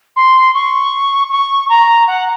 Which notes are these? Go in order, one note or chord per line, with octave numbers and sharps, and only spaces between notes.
C6
C#6
C#6
A#5
F#5